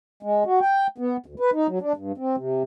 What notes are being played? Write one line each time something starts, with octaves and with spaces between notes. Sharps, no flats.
G#3
F#4
G5
B3
D2
B4
D#4
F#3
D4
G2
C4
C3